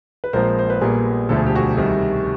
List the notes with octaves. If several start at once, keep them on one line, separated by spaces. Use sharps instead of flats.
B4
A#1 A#2 F3 G#3 C4 A#4 C5
C5
B4
A#1 A#2 G3 B3 G#4 A#4
E1 D2 D3 F3 A3 A4
G#4
G4
F#4 G#4
C2 C3 D#3 G3